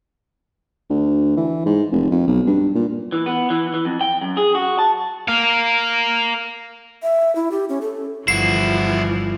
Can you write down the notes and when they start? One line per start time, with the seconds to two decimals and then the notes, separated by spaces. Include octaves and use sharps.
0.90 D2
1.37 E3
1.66 G#2
1.92 F1
2.11 F2
2.27 B1
2.47 G2
2.75 A#2
3.12 E3
3.26 B3
3.50 E3
3.74 E3
3.85 F2
4.01 G5
4.21 F#2
4.37 G#4
4.55 F#4
4.79 A5
5.28 A#4 F5
7.03 E5
7.35 E4
7.51 G4
7.69 C#4
7.81 A4
8.28 G1 E3 F3 E4 F#4 C7